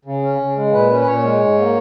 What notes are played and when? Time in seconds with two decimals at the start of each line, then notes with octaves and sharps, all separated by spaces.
0.05 C#3
0.22 C#4
0.39 C#3
0.56 G#3
0.72 A#2 B4
0.90 C#4
1.00 B4
1.06 A#2 C#5
1.23 G#3
1.40 G#2
1.57 A#3